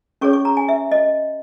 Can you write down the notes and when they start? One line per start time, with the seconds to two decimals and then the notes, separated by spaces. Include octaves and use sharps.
0.21 C#4 G#4 C#5 C#6
0.33 C#6
0.45 A#5
0.57 G#5
0.69 E5
0.92 D#5